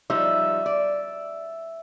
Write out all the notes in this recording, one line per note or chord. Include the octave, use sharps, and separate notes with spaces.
F3 G3 D#4 E5
D5